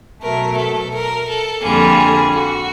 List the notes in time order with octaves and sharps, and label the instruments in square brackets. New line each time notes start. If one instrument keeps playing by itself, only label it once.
[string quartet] B2 F#3 A3 [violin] A#4
[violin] A4
A#4
A4
[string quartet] F2 D3 G3 A#3 [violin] G#4
[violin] F#4